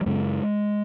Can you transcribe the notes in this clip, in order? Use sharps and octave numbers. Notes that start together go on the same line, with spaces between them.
F#3
F#2 C#3 G#3